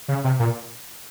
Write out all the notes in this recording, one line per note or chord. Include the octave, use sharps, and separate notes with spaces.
C#3
C3
A#2